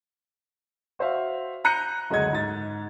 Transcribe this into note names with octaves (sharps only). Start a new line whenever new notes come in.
F#4 C5 E5 F5
A#5 F#6 G6 C#7 D#7
F#1 D2 G#3 D#5 G#6
G#2 A6